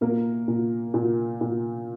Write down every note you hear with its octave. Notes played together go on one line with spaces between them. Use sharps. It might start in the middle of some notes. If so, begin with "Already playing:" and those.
A#2 A#3 A#4
A#2
A#2
A#2